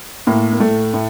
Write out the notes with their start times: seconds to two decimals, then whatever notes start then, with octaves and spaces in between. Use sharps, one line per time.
0.27 A2 A#3
0.53 A#3
0.60 A2 A3
0.94 A2